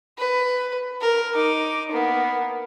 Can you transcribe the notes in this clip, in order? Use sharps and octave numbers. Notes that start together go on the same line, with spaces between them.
B4
A#4
D#4 D6
A#3 B3